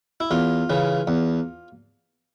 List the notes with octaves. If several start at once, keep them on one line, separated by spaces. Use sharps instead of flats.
E4
E2 F4
C#3 E3
E2